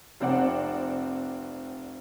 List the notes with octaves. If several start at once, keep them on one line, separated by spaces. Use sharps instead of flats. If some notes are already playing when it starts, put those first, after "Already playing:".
F1 C4 D5 F#5